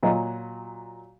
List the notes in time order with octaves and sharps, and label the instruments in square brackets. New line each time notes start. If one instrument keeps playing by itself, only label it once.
[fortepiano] A#2 F#3 D#5